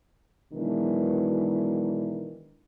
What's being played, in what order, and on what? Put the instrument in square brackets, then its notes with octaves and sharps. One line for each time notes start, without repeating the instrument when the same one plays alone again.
[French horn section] B2 D#3 E3 F#3 G#3 D4